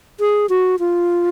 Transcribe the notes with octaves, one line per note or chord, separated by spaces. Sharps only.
G#4
F#4
F4